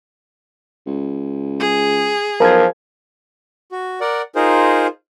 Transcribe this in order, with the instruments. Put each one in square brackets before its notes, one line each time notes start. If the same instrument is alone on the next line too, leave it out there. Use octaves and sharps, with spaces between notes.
[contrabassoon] C#2
[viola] G#4
[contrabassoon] B1 [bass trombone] F3 [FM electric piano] A#4 G#6
[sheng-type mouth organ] F#4
A#4 D5 F#5
D#4 F4 G#4 A#4 C5